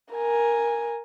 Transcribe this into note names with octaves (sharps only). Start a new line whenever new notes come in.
A#4 G#5